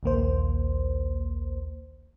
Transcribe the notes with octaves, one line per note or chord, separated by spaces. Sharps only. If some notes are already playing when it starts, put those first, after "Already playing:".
A#1 D#2 A#3 C5